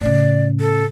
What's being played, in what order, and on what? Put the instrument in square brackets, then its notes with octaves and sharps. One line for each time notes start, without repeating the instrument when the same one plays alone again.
[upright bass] A2 C#3 [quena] D5
[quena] A4